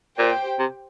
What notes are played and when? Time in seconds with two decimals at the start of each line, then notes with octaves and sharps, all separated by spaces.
0.18 A#2 G4 C5 G5
0.59 C3